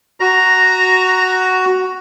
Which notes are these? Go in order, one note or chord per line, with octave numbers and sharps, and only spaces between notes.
F#4 A#5